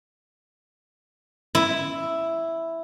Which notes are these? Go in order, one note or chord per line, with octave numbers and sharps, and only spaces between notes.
E4